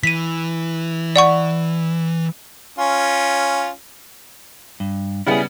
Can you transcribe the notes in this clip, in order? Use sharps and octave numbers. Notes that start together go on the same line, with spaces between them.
E3 B6 D#7
D5 F#5 C#6
C#4 F4
G2
C#3 G3 B3 E4 G#4